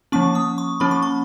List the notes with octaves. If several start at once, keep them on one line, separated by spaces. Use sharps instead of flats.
F3 A#3 C#4 C#6
D#6
C#6
F3 A#3 C#4 B5
C#6
B5